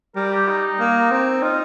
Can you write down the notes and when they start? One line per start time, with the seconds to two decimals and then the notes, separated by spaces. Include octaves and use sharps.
0.16 G3 A#4
0.31 G4
0.48 D#4
0.79 A#3
1.11 C4
1.42 D#4 F4